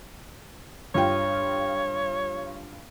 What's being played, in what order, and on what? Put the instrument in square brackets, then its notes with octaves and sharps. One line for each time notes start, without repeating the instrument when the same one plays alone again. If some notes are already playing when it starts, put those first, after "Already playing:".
[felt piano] G2 F4 G5 [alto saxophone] C#5